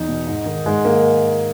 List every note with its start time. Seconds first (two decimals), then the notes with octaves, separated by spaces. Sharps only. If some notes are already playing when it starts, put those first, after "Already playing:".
Already playing: E2 D#4
0.09 B2
0.27 G#2
0.46 D#3
0.66 G#2 G#3
0.85 D#3 A#3